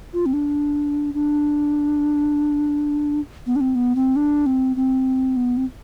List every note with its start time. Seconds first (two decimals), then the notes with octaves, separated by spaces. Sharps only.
0.13 F4
0.26 C4
0.33 D4
1.14 D4
3.47 B3
3.56 D4
3.61 C4
3.75 B3
3.95 C4
4.16 D4
4.46 C4
4.76 C4
5.36 B3
5.57 C4